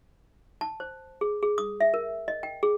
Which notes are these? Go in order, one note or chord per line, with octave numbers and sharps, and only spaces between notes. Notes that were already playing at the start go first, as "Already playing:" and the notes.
A5
C5
G#4
G#4
D#6
E5
A#4
D#5
G5
G#4